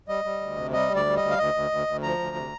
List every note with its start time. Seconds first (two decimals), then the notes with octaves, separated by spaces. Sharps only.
0.08 G3 D#5
0.24 G3
0.41 D2
0.57 C3
0.73 G3 D#5
0.90 D2
0.95 D5
1.05 G3
1.17 D2 D#5
1.30 F5
1.38 D2 D#5
1.54 D2
1.71 D2
1.87 D2
2.03 F3 A#5
2.19 D2
2.36 C3